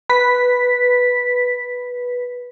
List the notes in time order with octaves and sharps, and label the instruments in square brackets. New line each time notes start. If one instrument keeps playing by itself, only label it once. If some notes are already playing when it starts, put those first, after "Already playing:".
[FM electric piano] B4 B6